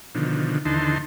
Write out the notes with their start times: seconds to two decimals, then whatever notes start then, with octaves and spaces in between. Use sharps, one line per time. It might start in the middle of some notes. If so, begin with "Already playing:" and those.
0.15 B2 D3 D#3 F3
0.65 D#2 D3 E3 D#4 A5 C6